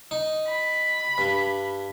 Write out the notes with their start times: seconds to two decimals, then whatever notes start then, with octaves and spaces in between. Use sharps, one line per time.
0.11 D#4
0.48 B5
1.18 G2